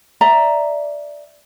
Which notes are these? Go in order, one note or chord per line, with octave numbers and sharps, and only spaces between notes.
D5 E5 A#5